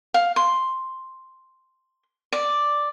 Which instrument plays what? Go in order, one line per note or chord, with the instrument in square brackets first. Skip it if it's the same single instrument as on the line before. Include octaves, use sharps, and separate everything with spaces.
[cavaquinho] F5
C6
D5